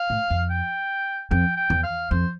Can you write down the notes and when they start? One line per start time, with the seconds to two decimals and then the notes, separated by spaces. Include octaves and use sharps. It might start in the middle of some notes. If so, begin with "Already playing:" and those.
Already playing: F5
0.10 A2
0.30 F2
0.50 G5
1.31 F2 G5
1.57 G5
1.70 E2
1.84 F5
2.11 F2 C5